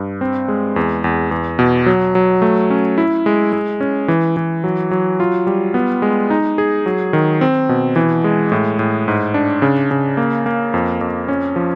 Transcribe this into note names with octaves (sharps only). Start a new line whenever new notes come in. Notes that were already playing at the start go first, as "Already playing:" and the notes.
Already playing: G2
C4
G#3
E2
E2
E2
B2
F#3
F#3
A3
C#4
E4
G#3
G#3
C#4
E3
E3
F#3
F#3
F4
G3
B3
G#3
D#4
G#4
F#3
D#3
C4
B2
E3
G#3
A2
A2
G#2
D4
C#3
C#3
A#3
A#3
F2
F2
C#4
F3